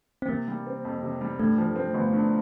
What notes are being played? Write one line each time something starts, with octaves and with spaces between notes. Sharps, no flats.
C4
C3 A#3
G3
C4
F2
C3
G3
G2 A3
F3
C4
G1
G2